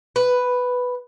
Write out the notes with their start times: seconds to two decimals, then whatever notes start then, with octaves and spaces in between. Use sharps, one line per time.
0.16 B4